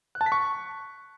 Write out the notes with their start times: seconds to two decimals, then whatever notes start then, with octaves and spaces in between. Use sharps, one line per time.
0.15 F#6
0.21 A5
0.26 B6
0.32 C#6